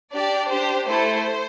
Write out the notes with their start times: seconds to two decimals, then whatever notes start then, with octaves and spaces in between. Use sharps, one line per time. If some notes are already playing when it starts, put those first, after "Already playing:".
0.13 D4 G4 D5
0.50 D4 G4 C5
0.87 A3 E4 A4 C5